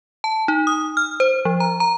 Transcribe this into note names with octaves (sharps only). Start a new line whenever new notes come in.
A5
D#4
D#6
F6
C5
F3
A#5
A#5